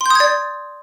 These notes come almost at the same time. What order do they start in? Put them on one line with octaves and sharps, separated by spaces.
C6 G6 D#6 G#6 D5